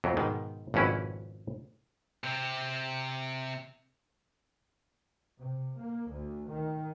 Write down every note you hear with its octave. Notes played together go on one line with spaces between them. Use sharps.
F2 F#3 A3
G#2 B2 D#3
G#1 F2 B2 C#4 E4 B4
C3 C4
C3
A#3
D2
D#3